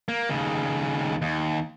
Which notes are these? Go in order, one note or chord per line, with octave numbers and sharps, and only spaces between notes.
A#3
D#2 C#3
D#2